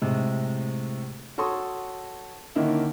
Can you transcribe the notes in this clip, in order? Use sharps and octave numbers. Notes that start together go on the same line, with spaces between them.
A2 C3 G#3
F#4 A4 C#5 C6 C#6 D#6
D3 D#3 A#3 C#4 D#4 E4